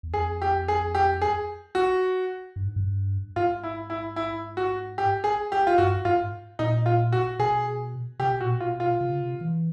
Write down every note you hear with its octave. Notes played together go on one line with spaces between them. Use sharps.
E2
F2 G#4
G4
G#4
G4
G#4
F#4
G2
G#2
G2
G#2 F4
E4
E4
E4
F#4
G4
G#4
G4
F4
G2 F#4
G#2 F4
A#2 D#4
F4
F#4
B2 G#4
C3 G4
B2
A#2 F#4
B2
F4
F4
C3
C#3
C3
E3